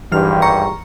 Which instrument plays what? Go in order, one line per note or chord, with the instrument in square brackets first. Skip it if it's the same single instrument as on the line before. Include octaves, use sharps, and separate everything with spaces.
[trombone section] G#1 G2 [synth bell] E3 F6
[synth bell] A#5 C#6 C#7